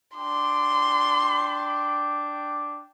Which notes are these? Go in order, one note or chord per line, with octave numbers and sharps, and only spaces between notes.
D4 G5 C6 D6